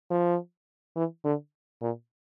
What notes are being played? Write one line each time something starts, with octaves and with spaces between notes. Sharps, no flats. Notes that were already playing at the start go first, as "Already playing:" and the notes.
F3
E3
D3
A#2